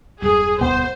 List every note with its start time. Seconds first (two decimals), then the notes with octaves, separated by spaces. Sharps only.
0.22 E1 G2 G#4
0.61 D1 B2 B3 C5